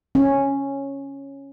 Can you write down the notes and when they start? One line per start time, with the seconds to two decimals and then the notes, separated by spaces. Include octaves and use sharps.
0.15 C#4